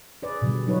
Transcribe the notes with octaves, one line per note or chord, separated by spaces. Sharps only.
G#4 B4 D5
B2 D3 G3
F#3 B3 D#4 F4 B4 C#5